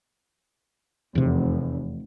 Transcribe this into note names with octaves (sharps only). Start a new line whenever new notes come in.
F1 E2 C3